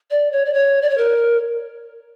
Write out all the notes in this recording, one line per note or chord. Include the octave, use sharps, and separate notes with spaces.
D5
C#5
D5
C#5
D5
C#5
A#4